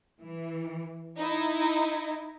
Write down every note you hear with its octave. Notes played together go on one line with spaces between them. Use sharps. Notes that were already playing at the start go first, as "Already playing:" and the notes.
E3
D#4 E4